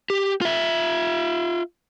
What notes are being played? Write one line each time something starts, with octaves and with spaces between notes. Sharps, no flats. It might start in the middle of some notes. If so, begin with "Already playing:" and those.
G4
F4 E5